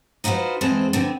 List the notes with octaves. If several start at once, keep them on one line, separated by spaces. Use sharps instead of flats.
D#4 F4 F#4 B4 C5
E2 G#3 C4 G#4 A4 C5
D3 B3 C4